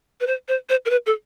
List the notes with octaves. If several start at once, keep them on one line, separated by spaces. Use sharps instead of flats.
B4
C5
C5
C5
A#4
B4
A4